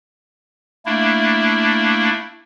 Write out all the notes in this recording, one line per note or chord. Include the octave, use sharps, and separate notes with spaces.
A3 A#3 D4 E4